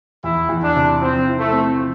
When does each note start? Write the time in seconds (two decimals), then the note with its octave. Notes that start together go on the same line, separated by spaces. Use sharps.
0.24 E2 E4
0.49 E2
0.62 D4
0.76 C3
1.01 F3 C4
1.27 E4
1.39 A3
1.52 C4
1.79 F3